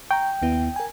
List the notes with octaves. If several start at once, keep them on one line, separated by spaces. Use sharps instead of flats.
G5 A#5 C#6
D#2 B3 E4
A#4 G#5